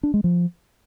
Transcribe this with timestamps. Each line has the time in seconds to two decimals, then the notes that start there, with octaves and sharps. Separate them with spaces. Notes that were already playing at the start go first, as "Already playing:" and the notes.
0.03 D4
0.14 G#3
0.24 F3